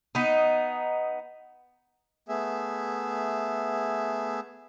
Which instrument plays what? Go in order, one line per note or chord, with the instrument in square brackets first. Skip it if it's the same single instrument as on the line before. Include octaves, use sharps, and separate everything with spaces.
[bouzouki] B3 D#4
[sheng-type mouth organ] A3 B3 G#4 E5